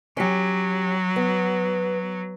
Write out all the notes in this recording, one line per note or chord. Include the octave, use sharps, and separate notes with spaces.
F#3 C#4 G4
B3